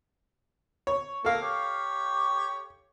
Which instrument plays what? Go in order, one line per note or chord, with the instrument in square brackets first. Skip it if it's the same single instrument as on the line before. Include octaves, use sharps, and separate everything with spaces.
[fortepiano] C#5
[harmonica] A#3 [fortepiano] A4 F5
[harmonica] G4 C#5